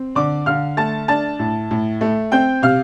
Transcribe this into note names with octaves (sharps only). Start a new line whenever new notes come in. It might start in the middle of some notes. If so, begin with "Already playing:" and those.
Already playing: C4
D3 D5 D6
D3 F5 F6
A3 A5 A6
D4 A5 A6
A2
A2
A3
C4 G5 G6
C3 F5 F6